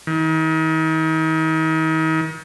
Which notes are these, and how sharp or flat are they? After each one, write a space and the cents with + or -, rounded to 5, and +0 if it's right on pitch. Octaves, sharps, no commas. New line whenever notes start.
D#3 +40